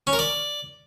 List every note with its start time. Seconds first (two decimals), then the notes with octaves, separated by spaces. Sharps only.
0.07 C#4
0.13 A#4
0.19 D5